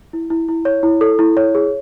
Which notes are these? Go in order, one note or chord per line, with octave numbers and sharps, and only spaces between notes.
E4
E4
E4
C#5
E4
A4
E4
C#5
G#4